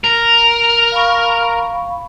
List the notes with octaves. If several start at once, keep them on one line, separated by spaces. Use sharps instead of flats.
A#4
F5 B5 C#6